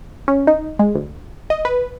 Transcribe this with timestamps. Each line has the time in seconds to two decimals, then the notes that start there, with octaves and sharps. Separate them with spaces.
0.28 C#4
0.47 D#4
0.79 G#3
0.95 D2
1.50 D#5
1.65 B4